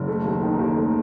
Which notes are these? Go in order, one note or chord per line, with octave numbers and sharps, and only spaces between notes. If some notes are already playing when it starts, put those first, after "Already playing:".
Already playing: F#1
A3
D#2
D#3
D#2
A3